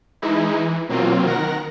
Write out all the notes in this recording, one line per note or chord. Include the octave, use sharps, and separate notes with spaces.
E3 G#3 D#4 E4
E3
B2 F#3 A#3 C4 F4
D#3 A#4 F#5 A#6